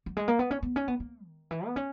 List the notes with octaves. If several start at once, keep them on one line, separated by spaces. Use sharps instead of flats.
F#3
G#3
A#3
B3
C#4
B3
C#4
B3
A#3
D#3
E3
B3
C#4